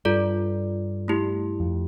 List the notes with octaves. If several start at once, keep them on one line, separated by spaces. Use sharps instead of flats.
G2 F4 A4 D5
A3 E4 G4
F2